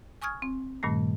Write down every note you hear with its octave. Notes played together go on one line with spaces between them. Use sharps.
G#5 C#6 D#6 F6 G#6
C4
G2 A#2 D#3 G3 A3